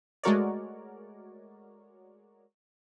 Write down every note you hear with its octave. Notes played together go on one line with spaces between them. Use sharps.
G#3 A3 F#4 A#4 C#5 D5